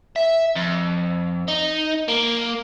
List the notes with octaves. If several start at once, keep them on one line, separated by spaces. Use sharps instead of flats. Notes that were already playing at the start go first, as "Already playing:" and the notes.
E5
F2
D#4
A#3